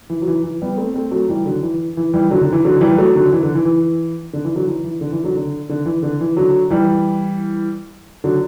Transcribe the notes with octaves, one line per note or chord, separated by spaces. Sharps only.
E3
F#3
E3
E3
G3 B3
A3 C4
A3 C4
F#3 A3
E3 G3
D3 F#3
E3
E3
E3 G3
D3 F#3
D3
E3
D3 F#3
E3 G3
F#3 A3
D3 F#3
E3
D3
E3
E3
D3
E3
D3 F#3
E3
E3
D3
E3
D3 F#3
D3
D3
E3
D3
E3
D3 F#3
E3 G3
D3 F#3